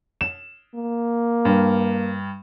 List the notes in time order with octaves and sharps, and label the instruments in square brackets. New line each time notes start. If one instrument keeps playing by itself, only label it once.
[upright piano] E7
[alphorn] A#3
[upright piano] G2